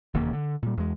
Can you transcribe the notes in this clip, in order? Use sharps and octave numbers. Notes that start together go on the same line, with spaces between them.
E1 D#2 C#3 A#3
D3
A#2 G3
E2 G#3